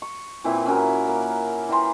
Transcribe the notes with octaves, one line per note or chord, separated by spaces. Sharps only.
C#6
A#2 E3 C4 E4
C#4 E4 F#4 A#4
A#3
E3 G5 A#5 C6